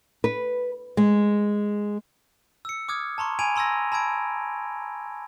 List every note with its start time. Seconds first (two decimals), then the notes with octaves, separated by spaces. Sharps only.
0.24 B4
0.97 G#3
2.65 E6 C#7
2.88 D6 D#6 F6 G#6
3.18 A5 A#5 C6 C#6
3.39 G#5 B5 G#6 D7 D#7 F7
3.56 A#5 C6 E6 G#6 A#6
3.92 A5 B5 E6 G#6 D7